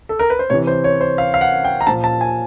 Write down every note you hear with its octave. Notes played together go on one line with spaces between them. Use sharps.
A4
A#4
B4
C5
C3 E3 C#5
C5
C#5
C5
F5
F5
F#5
G5
A#5
A#2 F3 A5
A5
G#5